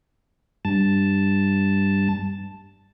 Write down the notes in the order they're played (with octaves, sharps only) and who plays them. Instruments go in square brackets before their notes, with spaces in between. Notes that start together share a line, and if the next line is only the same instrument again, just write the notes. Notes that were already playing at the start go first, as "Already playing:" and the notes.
[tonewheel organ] G2 A5